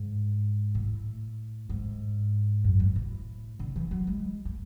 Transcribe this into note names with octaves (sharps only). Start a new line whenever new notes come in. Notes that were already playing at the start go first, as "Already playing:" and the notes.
Already playing: G#2
A2
G#2
F#2
G#2
A2
D3
E3
F#3
G#3
A3